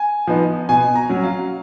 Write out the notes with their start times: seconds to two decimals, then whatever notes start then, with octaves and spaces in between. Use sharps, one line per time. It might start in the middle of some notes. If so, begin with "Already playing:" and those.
Already playing: G#5
0.27 F3 B3 D#4
0.69 B2 G#5
0.96 A#5
1.09 F#3 C#4
1.23 F5